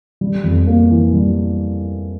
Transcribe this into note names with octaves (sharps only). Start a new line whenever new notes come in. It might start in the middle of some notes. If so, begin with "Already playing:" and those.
G3
F2
A#3
E3
G3